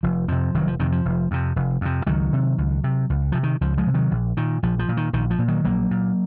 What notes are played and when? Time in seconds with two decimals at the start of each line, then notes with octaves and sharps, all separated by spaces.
0.03 F1 F3
0.28 F2 C3 F3
0.54 F1 D#3 F#3
0.67 F3
0.79 F2 C3 D#3
0.92 F3
1.05 F1
1.31 F2 C3
1.56 F1
1.81 F2 C3
2.07 C#2 D#3 F#3
2.33 C3
2.58 C#2
2.84 C3
3.10 C#2
3.32 C3 F3
3.43 D#3
3.61 C#2 F3
3.78 F3 G#3
3.87 C3
3.94 D#3 F#3
4.11 A#1
4.37 A#2 D#3
4.63 A#1 F3
4.79 F3
4.89 A#2
4.97 D#3
5.13 A#1 D#3
5.30 F3
5.39 A#2
5.48 D#3 F#3
5.64 A#1 F#3 A#3
5.91 A#2